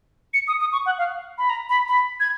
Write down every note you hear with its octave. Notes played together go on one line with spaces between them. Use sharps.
C#7
D#6
D#6
C#6
F#5
F5
B5
A#5
B5
B5
G#6